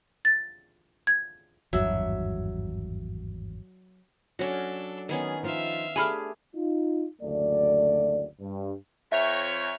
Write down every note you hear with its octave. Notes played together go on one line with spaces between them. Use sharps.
A6
G#6
G#1 E2 G2 F#3 E5
F#3 C#4 D4 F#4 A4
D#3 B3 C#4 G#4
F3 D#4 F4 E5 F5
A3 D4 G4 G#4 G#5 B5 F6
D#4 F4
F#1 D2 A3 D5
G2
F2 C#5 E5